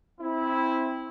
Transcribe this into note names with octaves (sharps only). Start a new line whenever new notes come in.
C4 E4